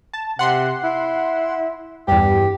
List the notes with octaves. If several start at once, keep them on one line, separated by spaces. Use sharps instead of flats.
A5
C3 F#5 C6
E4
E2 G2 G4